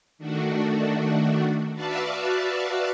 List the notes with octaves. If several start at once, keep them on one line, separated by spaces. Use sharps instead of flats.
D#3 A3 D4 F#4
F#4 B4 D5 E5 F5 A5